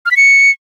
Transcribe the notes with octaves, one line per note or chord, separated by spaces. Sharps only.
F6
B6
C#7